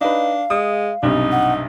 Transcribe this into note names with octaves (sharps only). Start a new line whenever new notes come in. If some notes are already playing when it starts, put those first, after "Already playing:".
D4 D#4 B4 F5
G#3 D#6
B1 G2 C3 D#4
F#5